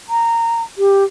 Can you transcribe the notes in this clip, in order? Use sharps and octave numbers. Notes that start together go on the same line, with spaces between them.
A#5
G4